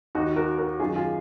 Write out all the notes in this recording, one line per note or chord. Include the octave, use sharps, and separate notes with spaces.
D#2 D#3 D#4 F#4
F#4 A#4
F#4 A#4
F#2 D#3 F4 G#4
F4 G#4